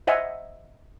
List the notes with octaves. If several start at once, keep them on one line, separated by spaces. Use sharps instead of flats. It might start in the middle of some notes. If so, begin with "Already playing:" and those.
C5 D#5 E5 F#5 G#5